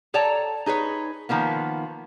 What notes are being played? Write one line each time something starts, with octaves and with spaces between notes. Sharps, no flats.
A4 C#5 D5 G5 A5 A#5
D#4 G#4 B4 C#5
D#3 F3 A#3 B3